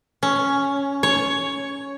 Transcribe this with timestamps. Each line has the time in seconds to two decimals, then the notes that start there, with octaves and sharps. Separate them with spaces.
0.23 C#4
1.03 C#5